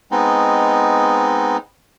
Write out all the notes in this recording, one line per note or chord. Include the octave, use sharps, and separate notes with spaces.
G#3 B3 C4 D#4